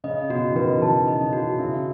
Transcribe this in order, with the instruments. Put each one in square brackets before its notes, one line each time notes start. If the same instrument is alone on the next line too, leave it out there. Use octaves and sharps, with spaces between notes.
[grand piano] C#3 [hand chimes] D#5
[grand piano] B2 [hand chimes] F#4
[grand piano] E3
[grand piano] D#3 [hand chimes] B4
[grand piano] D#3 [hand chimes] A5
[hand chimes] D#5
[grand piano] C#3
[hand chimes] F#4
[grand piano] C#3 [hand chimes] E5